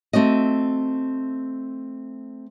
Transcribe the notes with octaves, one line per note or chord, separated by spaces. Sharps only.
A3 C4 F#4 D#5